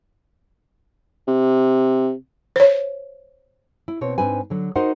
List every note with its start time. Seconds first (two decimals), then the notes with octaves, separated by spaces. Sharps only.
1.28 C3
2.56 C5 C#5
3.88 E4
4.01 B2 C4 C#5
4.18 G#2 C4 D4 B4 G#5
4.50 D3 F#3
4.76 D#4 F#4 A#4 C5 D#5 F#5